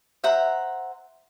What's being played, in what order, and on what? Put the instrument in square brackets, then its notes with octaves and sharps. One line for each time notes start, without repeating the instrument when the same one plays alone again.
[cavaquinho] C5 E5 F#5 A#5